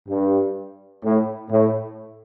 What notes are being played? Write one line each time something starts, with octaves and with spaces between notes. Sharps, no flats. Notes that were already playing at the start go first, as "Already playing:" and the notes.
G2
A2
A2